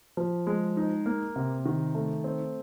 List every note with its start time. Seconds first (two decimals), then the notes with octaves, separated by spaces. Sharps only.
0.17 F3
0.47 G#3
0.77 D#4
1.06 A#3
1.36 C3
1.66 D#3
1.94 A3
2.24 C4